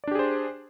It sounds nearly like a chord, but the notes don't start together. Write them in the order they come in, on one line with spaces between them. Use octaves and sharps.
D5 D4 G4 G#4 C5